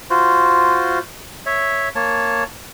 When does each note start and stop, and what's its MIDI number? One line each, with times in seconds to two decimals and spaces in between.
0.10 0.99 65
0.10 0.99 66
0.10 0.99 72
1.46 1.89 73
1.46 1.89 76
1.95 2.44 58
1.95 2.44 73
1.95 2.44 81